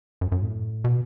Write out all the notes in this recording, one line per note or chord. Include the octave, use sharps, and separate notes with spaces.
F#2
F#2
A2
B2